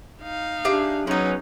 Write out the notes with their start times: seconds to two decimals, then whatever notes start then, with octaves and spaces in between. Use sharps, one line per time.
0.23 D#4 F5
0.65 D4 G4 G#4 E5
1.07 F#3 G#3 B3 C#4 D#4